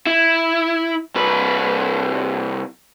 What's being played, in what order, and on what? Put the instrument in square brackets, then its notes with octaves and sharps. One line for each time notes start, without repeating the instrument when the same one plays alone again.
[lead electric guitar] E4
C2 B4